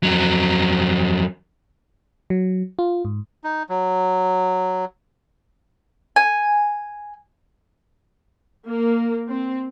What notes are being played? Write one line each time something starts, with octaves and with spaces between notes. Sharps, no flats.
F2 F#3
F#3
F4
G#2
D#4
F#3
G#5
A#3
C4